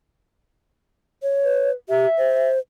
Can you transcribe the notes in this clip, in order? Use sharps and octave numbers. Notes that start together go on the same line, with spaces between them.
C#5
B4
G4 E5
C5